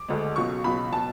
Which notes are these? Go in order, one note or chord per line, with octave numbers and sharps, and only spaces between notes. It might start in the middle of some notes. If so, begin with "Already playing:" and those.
Already playing: D6
D2 D3 G#3
C#2 B2 F#3 C#6
C#2 B2 F#3 B5
B2 F#3 A5